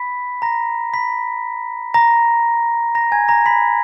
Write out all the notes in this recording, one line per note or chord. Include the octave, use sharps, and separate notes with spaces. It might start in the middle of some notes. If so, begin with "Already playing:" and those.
Already playing: B5 B6
A#5 A#6
B5 B6
A#5 A#6
A#5 A#6
G#5 G#6
A#5 A#6
B5 B6